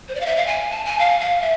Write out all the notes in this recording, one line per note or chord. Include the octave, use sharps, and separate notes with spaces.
C5
D5
F5
E5
F5
G#5
A5
G#5
F5
F5
E5